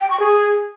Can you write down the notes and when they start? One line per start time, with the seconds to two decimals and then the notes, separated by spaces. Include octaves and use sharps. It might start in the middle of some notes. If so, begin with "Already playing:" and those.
0.01 G5
0.10 C#6
0.20 G#4